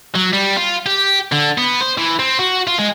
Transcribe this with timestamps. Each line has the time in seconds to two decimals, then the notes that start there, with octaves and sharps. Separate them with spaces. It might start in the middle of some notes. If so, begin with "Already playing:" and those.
0.15 F#3
0.33 G3
0.56 F4
0.86 G4
1.32 D3
1.58 B3
1.81 C5
1.98 E3
2.19 C4
2.39 F#4
2.67 F4
2.79 G#3